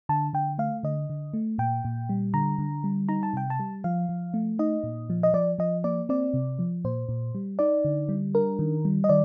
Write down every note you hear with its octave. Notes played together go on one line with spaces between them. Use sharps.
D3 A5
D3 G5
A3 F5
D3 D#5
D3
A3
A#2 G5
A#2
G3
D3 A#5
D3
G3
D#4 A#5
A5
C3 G5
A5
G3
F3 F5
F3
A3
D#4 D#5
A#2
F3
D#5
F3 D5
F3 D#5
A#3 D5
C4 D5
C3
F3
A#2 C5
A#2
G3
D#4 D5
D3
G3
D4 A#4
D#3
G3
D#5
D#3 D5